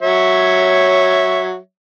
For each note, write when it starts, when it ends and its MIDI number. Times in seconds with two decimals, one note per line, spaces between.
0.01 1.58 54
0.01 1.58 73
0.01 1.58 76